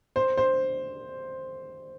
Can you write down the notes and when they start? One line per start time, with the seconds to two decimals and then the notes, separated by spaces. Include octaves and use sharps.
0.16 C5
0.37 C5